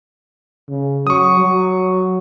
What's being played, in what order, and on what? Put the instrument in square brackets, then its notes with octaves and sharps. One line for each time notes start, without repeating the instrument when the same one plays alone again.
[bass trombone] C#3
[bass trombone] F#3 [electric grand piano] C#6 D#6
[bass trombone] F#3